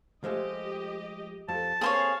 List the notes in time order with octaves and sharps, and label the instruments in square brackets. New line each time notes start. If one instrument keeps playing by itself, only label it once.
[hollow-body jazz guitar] F3 G#3 A3 [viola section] G4 D#5
[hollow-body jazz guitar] F2 [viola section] G4 A4 [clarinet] A5
[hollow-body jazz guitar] A#3 C4 A4 [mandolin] G#4 C5 C#5 [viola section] F5